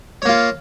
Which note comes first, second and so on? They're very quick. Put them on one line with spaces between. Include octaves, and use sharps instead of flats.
C#5 A#3 F4